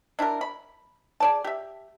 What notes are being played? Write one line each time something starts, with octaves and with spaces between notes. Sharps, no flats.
D4 E4 G4 A#4
B5
G#4 D5 A5
G4 E5